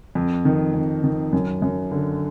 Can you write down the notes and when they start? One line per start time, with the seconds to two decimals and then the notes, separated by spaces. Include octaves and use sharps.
0.15 F2
0.45 D#3
0.74 F2
1.04 D#3
1.33 F#2
1.62 F#2
1.92 D3